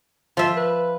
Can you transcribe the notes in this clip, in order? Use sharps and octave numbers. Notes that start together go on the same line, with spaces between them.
F3 F4 E5
B4